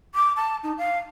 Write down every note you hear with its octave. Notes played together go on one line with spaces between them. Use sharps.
D6
A5
D#4
F5